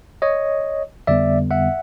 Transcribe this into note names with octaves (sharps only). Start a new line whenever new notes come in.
C#5 D#5
F2 D3 G3 B3 D5 E5
E5 F#5